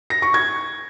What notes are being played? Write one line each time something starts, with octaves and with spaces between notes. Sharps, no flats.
A#6
C#6
G#6